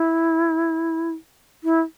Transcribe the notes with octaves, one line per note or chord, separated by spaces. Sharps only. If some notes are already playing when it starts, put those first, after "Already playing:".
Already playing: E4
E4